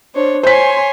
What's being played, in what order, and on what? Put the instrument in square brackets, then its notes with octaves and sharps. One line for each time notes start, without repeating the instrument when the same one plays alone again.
[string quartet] D4 C5 C#5
[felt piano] C5 B6 [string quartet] C#5 G#5 C6